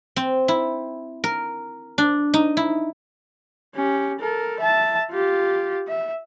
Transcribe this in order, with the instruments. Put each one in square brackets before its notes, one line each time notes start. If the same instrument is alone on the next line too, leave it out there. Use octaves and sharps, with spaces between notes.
[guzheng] C4
E4
A#4
D4
D#4
E4
[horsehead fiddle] C#4 G4
A4 A#4
E5 A5
F4 G4
E5